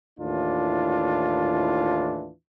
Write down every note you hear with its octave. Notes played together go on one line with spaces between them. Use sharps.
D#2 A2 E3 D4 F4